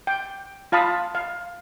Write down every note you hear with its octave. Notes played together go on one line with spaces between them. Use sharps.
G5
F4 F5 A5 B5 D#6
F5